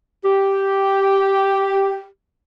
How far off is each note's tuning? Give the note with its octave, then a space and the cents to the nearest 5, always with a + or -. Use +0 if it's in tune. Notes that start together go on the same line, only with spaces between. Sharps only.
G4 -5